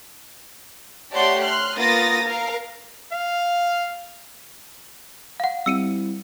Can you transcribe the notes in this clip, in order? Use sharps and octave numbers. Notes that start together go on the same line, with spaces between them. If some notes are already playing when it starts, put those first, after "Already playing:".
A3 G4 C#5 D5 F#5 C6
C6 F6 F#6
A#3 B3 F4 D#6 A6 A#6
A#4 F5
F5
F5 F#5
G3 C4 E4 E6 C#7 D#7